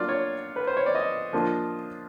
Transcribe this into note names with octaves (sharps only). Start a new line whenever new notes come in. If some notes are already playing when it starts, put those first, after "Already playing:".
Already playing: F#3 A#3 D4 F4 D5
C#5
B4
C5
C#5
D5
D#5
F3 A#3 D4 F4